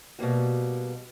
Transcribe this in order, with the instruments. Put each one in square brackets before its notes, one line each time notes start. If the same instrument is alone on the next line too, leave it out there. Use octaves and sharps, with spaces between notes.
[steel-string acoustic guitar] B2 G3 A#3 F#4